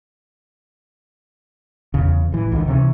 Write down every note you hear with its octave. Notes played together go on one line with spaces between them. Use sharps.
E2 C#3
A1 E3
C#2 D3 D#3
C3 E3 C#4